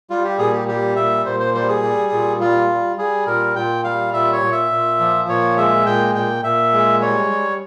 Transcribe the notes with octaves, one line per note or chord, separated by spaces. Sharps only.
G3 F4
G4
A#2 G#4
G4
G3 G4
A#2 E5
A#2 C5
C5
G3 C5
G#4
G3
A#2
G3 F4
G3
G3 G#4
A#2 A#4
A#2 G5
G3 F5
A#2 E5
C#5
A#2
E5
A#2
F3
A#2 C#5
G#3 E5
A#2 G5
A#2 G5
A#2 E5
G#3
G3 C#5
G3